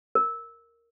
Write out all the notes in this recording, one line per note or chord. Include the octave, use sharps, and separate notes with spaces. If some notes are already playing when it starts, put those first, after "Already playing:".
A#4